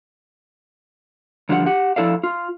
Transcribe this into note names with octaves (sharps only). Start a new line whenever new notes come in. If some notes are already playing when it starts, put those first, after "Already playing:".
E2 D3 F3 G3 E4 F#5
G4 F#5
F3 E4 A4 D5 F5
F4